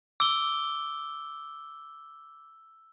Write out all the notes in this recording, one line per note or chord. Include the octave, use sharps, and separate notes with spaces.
D6 E6 G7